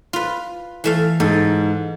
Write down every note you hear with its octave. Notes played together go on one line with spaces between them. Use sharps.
F4 B4
E3 A3 F5
G#2 A4